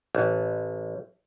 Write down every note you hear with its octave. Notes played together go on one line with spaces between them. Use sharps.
A1